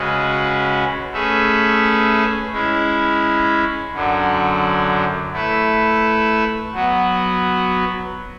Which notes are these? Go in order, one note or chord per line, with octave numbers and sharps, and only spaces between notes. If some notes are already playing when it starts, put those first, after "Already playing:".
Already playing: C#3 G#3 C#4 F#4 B4
A3 C#4 G#4 B4 E5
G#3 C#4 E4
F#2 D3 F#3
A3 E4 B4 E5
F#3 B3 F#4